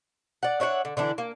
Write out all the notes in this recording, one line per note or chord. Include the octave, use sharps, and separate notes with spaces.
D5 F#5
D4 C#5 E5 F#5
D3
D3 E3 D4 E4
A#3